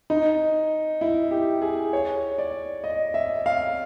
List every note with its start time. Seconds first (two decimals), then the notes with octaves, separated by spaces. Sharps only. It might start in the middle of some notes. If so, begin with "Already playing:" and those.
0.10 D#4
1.01 E4
1.31 G4
1.62 G#4
1.93 C#5
2.38 D5
2.84 D#5
3.14 E5
3.46 F5